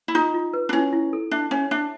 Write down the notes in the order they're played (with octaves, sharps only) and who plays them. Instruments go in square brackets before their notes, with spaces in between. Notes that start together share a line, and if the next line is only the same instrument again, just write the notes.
[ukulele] E4
[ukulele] D#4 [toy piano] F4
[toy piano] F4
B4
[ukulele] D4
[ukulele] C#4 [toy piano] E4
[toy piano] E4
A4
[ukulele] D4 [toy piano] E5
[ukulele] C#4 [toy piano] C#5
[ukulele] D4 [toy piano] E5